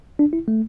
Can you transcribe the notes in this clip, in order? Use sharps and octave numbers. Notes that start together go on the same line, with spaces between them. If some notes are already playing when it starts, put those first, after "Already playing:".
D4
E4
A3